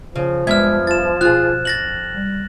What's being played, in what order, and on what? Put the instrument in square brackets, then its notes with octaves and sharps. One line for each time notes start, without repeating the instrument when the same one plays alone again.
[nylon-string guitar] C#3 [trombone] F3
[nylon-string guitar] E2 G2 E5 [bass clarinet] G#3 [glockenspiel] F6 G#6
[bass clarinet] F4 [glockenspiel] A6 E7
[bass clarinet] B2 [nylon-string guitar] F4 G#4 [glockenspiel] F#6
[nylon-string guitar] F2 [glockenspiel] A6 A#6 F#7
[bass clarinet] G3